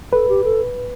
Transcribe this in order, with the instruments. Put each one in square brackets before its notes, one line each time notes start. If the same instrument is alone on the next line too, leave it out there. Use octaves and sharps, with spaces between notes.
[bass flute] A4 [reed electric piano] B4
[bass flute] G4
A4